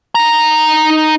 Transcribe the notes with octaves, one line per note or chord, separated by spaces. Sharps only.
D#4 A#5